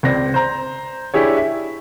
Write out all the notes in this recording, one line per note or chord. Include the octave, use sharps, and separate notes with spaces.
C#2 C4 D5 A#6
C5 A#5
D4 E4 G4 G#4 C#5
E5